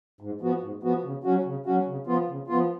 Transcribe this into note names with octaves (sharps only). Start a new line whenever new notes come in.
G#2
F3 B3 F#4
G#2
F3 B3 F#4
C#3
F#3 C#4 F#4
C#3
F#3 C#4 F#4
C#3
F3 B3 F4
C#3
F3 B3 F4